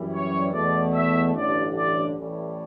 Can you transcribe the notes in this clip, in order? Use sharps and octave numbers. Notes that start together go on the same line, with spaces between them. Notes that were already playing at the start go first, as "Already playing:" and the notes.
Already playing: F#2 E3 G3
C#5
E2 B2 A3 D5
E5
A1 G2 D3 D5
D5
A1 A2 E3 G3